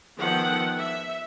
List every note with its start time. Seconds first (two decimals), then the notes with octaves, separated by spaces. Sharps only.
0.17 D#3 F3 B3 A4 F#5 G5
0.78 E5